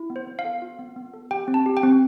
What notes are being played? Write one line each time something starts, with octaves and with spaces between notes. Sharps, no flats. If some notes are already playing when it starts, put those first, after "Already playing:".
Already playing: E4
B3
C5
B3
F5
A4
F4
B3
B3
A4
G4 G5
C4
A5
G4
G5
C4